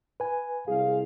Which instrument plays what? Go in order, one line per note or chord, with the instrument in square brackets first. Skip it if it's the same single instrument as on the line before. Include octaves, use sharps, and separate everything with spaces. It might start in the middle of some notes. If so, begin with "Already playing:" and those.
[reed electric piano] B4 G#5
[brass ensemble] C2 G#3 F5 [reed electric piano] G#4